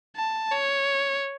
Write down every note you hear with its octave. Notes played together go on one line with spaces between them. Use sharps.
A5
C#5